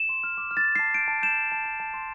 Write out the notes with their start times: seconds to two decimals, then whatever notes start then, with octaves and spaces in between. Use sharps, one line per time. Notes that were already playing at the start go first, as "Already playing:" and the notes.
Already playing: E7
0.09 C6
0.23 F6
0.38 D6
0.51 F6
0.57 A6
0.65 F6
0.76 A5 C7
0.94 G6 D7
1.08 A5
1.22 G6 E7
1.37 G6
1.52 A5
1.65 A5
1.80 A5
1.94 C6